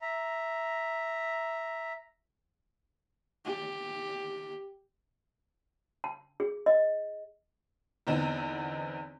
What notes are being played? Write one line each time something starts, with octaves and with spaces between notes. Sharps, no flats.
E5 A#5
G4
A5
G#4
D#5
E2 D3 B3 C4 D#4